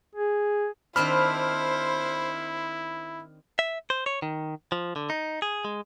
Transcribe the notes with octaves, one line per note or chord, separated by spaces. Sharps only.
G#4
D#3 C4 D4 E4 C5 B5 F6
E5
C5
C#5
D#3
F3
D3
D#4
G#4
G#3